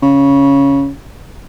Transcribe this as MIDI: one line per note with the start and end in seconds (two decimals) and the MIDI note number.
0.02 0.89 49